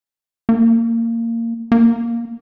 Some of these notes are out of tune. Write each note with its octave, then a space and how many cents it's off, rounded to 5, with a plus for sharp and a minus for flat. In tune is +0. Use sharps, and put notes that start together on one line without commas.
A#3 -20
A#3 +5